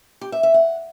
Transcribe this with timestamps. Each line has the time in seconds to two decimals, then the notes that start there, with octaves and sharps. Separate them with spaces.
0.21 G4
0.32 E5
0.43 E5
0.54 F#5